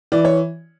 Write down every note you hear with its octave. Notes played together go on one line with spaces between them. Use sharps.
E3 D5
C#5